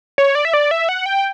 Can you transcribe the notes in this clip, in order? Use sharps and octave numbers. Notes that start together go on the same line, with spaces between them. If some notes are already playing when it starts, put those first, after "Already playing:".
C#5
D5
E5
D5
E5
F#5
G5